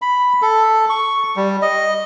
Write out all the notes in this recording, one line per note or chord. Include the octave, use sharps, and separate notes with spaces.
B5
A4
C#6
G3
D#5